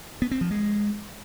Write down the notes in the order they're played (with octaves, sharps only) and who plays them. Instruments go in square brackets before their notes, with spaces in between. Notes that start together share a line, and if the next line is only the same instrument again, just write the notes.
[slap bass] B3
C4
F3
G#3